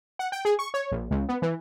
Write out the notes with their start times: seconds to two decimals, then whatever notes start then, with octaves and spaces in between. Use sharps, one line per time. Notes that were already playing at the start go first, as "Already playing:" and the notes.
0.19 F#5
0.32 G5
0.45 G#4
0.59 C#6
0.74 C#5
0.92 A#1
1.11 C#2
1.29 B3
1.42 E3